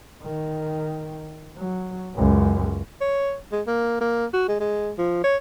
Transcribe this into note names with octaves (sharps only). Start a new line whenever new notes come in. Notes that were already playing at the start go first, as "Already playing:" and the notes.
D#3
F#3
C#2 F#2
C#5
G#3
A#3
A#3
F#4
G#3
G#3
F3
C#5